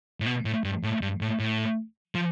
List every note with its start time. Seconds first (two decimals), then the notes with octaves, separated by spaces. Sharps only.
0.20 A2
0.26 B2
0.45 A2
0.64 G2
0.83 A2
1.02 G2
1.21 A2
1.40 A2
2.15 F3